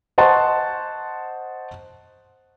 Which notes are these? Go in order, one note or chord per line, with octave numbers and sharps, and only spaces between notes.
C5 D#5 F#5 A5 C6 C#6